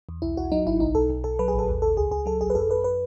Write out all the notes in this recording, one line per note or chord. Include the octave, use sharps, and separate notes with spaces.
E2
B1 E4
B1 F#4
F#3 D#4
G#1 E4
B1 D#4
B1 A4
B1
B1 A4
F#3 B4
G#4
A1
A4
D#2
D#2 A4
C#2 G#4
C#2 G#4
F#3 A4
A1 G#4
B4
F#2 A4
F#2 B4
B4